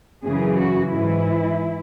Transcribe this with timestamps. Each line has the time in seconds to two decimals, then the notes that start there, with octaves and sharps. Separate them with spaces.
0.24 F#2 C#3 E3 G#4
0.58 F#4
0.91 G#2 E3 E4